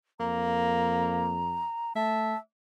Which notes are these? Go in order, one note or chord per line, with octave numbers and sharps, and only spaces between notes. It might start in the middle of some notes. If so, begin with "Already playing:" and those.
F2 A#3 A#5
A3 E5 A5